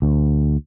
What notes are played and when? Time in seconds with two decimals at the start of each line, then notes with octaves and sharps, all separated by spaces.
0.02 D2